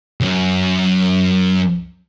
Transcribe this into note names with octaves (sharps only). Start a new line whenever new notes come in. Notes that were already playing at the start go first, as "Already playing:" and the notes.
C#2 F#2